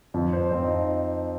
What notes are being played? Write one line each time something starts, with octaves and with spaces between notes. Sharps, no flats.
F2 F3
C5
F2 F3 C4
D#4